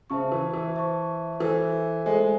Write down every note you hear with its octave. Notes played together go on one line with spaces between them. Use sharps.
C#3 C5 E5 A5 C#6
E3
E3
C5 E5 A5 C#6
E3 A4 C5 E5 G#5
G#3 A4 C5 E5 G#5
G#3